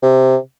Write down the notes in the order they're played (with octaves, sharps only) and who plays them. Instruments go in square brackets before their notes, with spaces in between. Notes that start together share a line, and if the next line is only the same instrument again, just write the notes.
[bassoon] C3